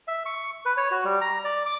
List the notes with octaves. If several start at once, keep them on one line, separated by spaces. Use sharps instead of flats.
E5
C#6
B4
C#5
F#4
G3
A#5
D5
D6